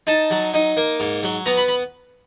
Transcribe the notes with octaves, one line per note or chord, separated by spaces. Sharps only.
D#4 A5
F#3
D#4
A#3
G#2
F#3
B3 A#5
B5
B5